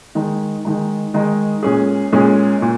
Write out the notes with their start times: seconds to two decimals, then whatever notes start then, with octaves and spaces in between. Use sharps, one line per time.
0.15 D#3 G#3 D#4
0.65 D#3 G#3 D#4
1.14 D#3 G#3 D#4
1.63 A#2 G#3 C#4 G#4
2.13 A#2 G#3 C#4 G#4
2.62 A#2